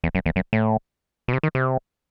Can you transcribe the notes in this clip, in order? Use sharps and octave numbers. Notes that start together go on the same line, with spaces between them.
E2
F#2
E2
F#2
A2
B2
C3
D#3
C3